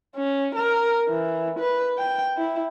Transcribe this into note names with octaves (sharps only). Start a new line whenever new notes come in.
C#4
A#4
E3
B4
G5
E4